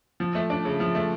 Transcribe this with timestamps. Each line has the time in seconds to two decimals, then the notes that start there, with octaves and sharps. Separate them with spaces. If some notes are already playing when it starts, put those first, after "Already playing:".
0.20 F3
0.35 A3
0.50 D4
0.65 C#3
0.80 F3
0.95 A3